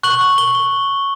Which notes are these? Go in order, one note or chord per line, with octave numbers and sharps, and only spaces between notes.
C#6 F#6 F#7
F#7
G7
G7